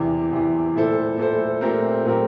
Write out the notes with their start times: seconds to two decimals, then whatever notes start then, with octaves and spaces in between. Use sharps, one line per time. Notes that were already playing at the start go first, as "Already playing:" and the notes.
Already playing: E2 C3 E3
0.32 E2 C3 E3
0.75 A#2 A3 E4 A4 C5
1.18 A#2 A3 E4 A4 C5
1.61 A#2 A3 C4 G4 A#4
2.05 A#2 A3 C4 G4 A#4